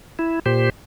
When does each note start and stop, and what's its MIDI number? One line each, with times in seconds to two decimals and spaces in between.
0.19 0.39 64
0.46 0.70 46
0.46 0.70 67
0.46 0.70 72